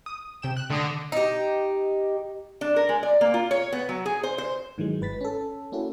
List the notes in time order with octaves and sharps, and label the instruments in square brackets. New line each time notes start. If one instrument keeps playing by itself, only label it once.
[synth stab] D#6
C3 G5 E7
F#6
[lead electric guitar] D3 [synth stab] A3 D#6 A#6
[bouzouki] D#4 G4
[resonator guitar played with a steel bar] D4
A#4
G#3
D5
A#3
F4
C#5
B3
F#3
G#4
C5
C5
[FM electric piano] G#2 D#3 E3 F#3 G#3
G1 B4 A6 B6
C#4 A4
A#3 C#4 E4 F#4 A4